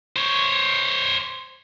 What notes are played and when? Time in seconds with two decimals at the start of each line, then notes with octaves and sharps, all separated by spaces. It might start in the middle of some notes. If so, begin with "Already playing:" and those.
0.16 C5 C#5